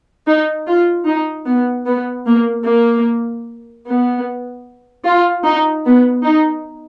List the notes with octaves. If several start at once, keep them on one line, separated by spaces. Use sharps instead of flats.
D#4
F4
D#4
B3
B3
A#3
A#3
B3
F4
D#4
B3
D#4